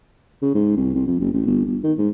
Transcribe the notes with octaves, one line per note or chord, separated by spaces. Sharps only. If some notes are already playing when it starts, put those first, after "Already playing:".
C#3
G#2
C2
C2
F2
F#1
A1
G1
G1
D#3
G#2